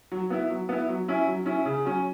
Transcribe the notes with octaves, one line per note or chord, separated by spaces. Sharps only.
F#3
B3 E4
F#3
B3 E4
F#3
C#4 E4
F#3
C#4 E4
C#3
F#3 C#4